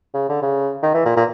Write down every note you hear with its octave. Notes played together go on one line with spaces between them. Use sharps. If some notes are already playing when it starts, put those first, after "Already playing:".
C#3
D3
C#3
D#3
E3
A#2
A#2